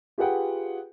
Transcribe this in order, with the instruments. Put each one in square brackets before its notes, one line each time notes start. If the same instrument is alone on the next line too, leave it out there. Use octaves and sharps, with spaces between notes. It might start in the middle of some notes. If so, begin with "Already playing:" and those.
[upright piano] F4 G4 G#4 B4 F#5 G5